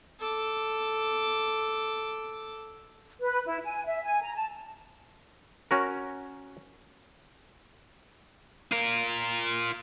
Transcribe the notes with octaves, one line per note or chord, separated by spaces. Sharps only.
A4 D6
B4
E4
G#5
E5
G#5
A#5
A5
C#4 F#4 A#4
F4 A#4